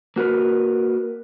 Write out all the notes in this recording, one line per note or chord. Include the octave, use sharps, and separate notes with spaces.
A#3 F#4 A#4 B4